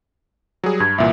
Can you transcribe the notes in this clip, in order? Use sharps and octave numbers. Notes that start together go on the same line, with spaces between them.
F#3 G3 G#4
G2 G#6
C2 A#2 E3 E5